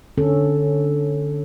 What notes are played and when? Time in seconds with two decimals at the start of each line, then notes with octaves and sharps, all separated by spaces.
0.17 D3 C#4 A4